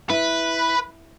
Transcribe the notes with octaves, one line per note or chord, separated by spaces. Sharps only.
E4 B4